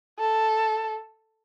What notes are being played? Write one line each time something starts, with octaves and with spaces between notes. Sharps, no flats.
A4